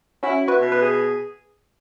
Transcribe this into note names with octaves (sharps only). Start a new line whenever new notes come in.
C#4 E4 F#4
E4
F#4 B4
B2
B4
G#4